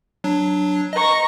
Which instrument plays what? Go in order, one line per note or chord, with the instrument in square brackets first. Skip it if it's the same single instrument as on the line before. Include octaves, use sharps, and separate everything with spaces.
[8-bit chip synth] F#3 D4
[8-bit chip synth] D#5 [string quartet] A#5 C#6 A#6